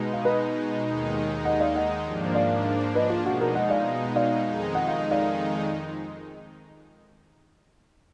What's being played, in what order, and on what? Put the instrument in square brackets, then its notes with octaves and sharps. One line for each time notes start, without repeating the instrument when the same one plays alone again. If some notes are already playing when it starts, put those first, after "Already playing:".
Already playing: [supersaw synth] B2 G#3 D#4
[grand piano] F5
B4 D#5
[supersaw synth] D#2 D#3 G#3 D#4
[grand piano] D#5 F#5
D5 F5
D#5 F#5
[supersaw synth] G#2 F3 A#3 D4
[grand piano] D5 F5
B4 D#5
F4
[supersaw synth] B2 G#3 D#4 [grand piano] F#4
[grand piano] F#4 A#4
D#5 F#5
D5 F5
D5 F5
[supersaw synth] F2 D#3 G#3 D#4
[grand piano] F#5
F5
D#5
D5 F5